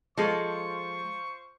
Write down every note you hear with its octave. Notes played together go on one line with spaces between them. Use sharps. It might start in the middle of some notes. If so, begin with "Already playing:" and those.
F3 G#3 F4 A4 C5 C#6